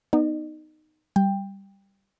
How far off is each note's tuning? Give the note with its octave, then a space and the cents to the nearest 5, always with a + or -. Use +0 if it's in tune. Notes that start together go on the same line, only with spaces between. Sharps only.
B3 +0 D#4 -10 D#5 -45
G3 +0 G5 +15